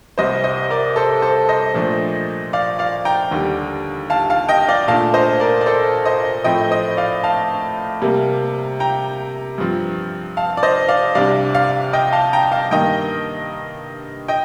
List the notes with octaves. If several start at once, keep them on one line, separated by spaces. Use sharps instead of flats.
C2 C3 G3 C5 D#5
C5 D#5
A#4 D5
A4 C5
A4 C5
C5 D#5
A#2 F3 A3 D4
D5 F5
D5 F5
G5 A#5
D#2 D3 G3
F5 A5
F5 A5
D#5 G5
D5 F5
A#2 A3 D4 F5 A5
C5 D#5
A#4 D5
D5
A4 C5
C5 D#5
A2 F3 A3 C4 D#5 G5
C5 D#5
D5 F5
F5 A5
C3 G3 A#3
G5 A#5
G2 F3 C4
F5 A5
D5
C5 D#5
D5 F5
C2 C3 G3 D4 D5 F5
D5 F5
D#5 G5
F5 A5
G5 A#5
F5 A5
G2 D#3 A#3 D#5 G5
D#5 G5